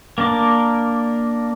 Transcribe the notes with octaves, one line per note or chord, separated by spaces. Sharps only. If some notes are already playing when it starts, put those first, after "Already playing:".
A#3 D4 A#4 D6